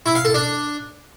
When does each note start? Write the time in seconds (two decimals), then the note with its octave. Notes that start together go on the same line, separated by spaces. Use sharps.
0.06 E4
0.15 F5
0.25 A4
0.34 D4